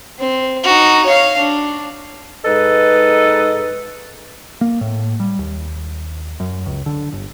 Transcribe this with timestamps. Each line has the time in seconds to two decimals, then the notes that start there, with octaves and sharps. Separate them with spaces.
0.19 C4
0.64 D#4 F#4
1.05 C#5 F5
1.37 D4
2.45 G#2 A4 B4 D#5
4.61 A#3
4.81 A2
5.20 G3
5.39 D#2
6.40 F#2
6.66 C#2
6.86 D3
7.12 G1